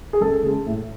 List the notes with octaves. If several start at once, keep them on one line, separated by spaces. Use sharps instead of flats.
G#4
C#2 A4
C#3 G#3
A2